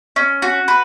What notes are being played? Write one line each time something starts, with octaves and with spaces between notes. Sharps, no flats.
C#4
F#4
B4